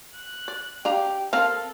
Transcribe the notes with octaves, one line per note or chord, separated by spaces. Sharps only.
F#6
D5
D4 G4 F5 A#5
C4 A4 A#4 F5 A5